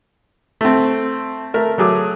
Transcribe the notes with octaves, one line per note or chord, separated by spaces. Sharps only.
A3 C4
A3 A#4 E5
F#3 A3 G#4 D6